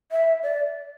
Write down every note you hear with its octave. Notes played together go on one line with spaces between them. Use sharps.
E5
D5